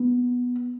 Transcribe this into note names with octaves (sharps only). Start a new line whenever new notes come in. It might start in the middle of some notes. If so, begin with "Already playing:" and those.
Already playing: B3